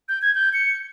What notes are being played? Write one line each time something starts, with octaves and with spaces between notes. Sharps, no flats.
G6
G#6
G6
C#7